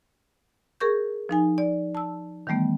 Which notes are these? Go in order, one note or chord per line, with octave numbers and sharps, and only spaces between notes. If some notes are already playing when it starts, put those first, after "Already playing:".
G#4 A#4 C#6 G6
F3 D#4 G#5
D5
A5 E6
D#3 E3 G3 A3 B3